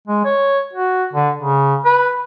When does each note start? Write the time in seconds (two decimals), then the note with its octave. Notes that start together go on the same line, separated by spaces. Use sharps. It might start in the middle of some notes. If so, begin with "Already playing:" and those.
0.07 G#3
0.25 C#5
0.73 F#4
1.13 D3
1.38 C#3
1.85 B4